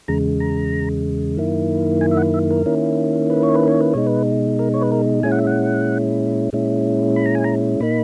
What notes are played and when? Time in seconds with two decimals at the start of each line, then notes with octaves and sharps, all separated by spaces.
0.08 E2 C#3 G#3 A#5
0.40 A#5
1.37 F#2 D#3 A#3 E4
2.01 G#5
2.11 E5
2.17 F#5
2.34 E5
2.50 A#4
2.66 D#3 A#3 C#4 E4
3.30 B4
3.43 C#5
3.55 B4
3.68 C#5
3.81 B4
3.94 B2 G#3 D#4 C#5
4.07 B4
4.59 A#4
4.74 C#5
4.82 B4
4.92 A#4
5.23 A#2 G#3 C#4 E4 G#5
5.32 F#5
5.38 E5
5.47 F#5
6.53 A#2 G#3 C#4 E4
7.16 B5
7.26 A#5
7.35 G#5
7.44 A#5
7.80 A#2 A#3 D#4 B5